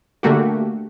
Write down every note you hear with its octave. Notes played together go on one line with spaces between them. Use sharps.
D3 A3 A#3 F#4 G4